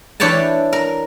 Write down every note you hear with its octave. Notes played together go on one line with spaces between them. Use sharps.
E3 D4 C#5 G5 A5
A#4